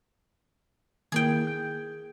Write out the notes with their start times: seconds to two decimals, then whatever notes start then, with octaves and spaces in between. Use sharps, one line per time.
1.12 D#3 A#3 E4 G#4 G5
1.47 G6